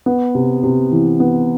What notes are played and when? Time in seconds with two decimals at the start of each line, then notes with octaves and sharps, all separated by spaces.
0.06 B3
0.35 C3
0.63 C3
0.92 E3
1.20 B3